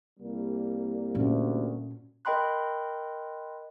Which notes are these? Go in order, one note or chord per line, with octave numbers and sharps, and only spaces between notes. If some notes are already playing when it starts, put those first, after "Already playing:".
C2 G3 A#3
D2 A#2 C#4
A#4 D#5 G5 B5 C6 F#6